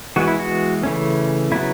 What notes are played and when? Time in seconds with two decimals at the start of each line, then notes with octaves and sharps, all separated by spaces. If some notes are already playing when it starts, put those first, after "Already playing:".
0.16 E3 G#3 B3 F#4
0.27 E4
0.39 F#4
0.83 C#3 E3 A3 C#4
1.51 C#3 F#3 B3 E4